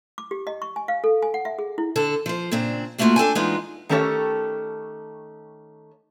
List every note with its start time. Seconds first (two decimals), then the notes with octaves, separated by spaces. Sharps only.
0.18 D6
0.31 G4
0.47 D#5
0.62 C#6
0.76 G#5
0.88 F5
1.04 A4
1.22 G#5
1.34 F#5
1.45 E5
1.59 G#4
1.78 E4
1.96 D3 A4
2.26 F3 C5
2.51 A#2 C#3 C4 D4
2.98 G3 A3 A#3 D#4 F4 F#4
3.16 D4 A4 G5 G#5
3.35 E3 G#3 B3 D4 D#4 F4
3.89 D#3 A3 C#4 G4 A4 C#5